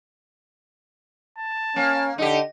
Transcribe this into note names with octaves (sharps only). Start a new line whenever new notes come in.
A5
A#3 C#4
D3 D#4 G4